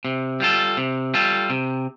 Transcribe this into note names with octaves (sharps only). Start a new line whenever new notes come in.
C3
G3 F4 A4
C3
G3 F4 A4
C3